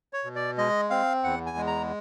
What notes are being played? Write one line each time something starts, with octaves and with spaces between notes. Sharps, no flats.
C#5
B2
D5
G#3 D#5
C4 F5
E2 F#5
G#5
G#3
A#5